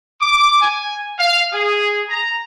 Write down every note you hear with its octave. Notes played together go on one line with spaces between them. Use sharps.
D6
G#5
F5
G#4
A#5